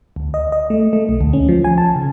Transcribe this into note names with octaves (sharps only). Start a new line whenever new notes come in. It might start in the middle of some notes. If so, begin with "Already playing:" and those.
D2
D#5
D#5
A3
A3
B1
D2
C#4
F3
G#5
A5
C#3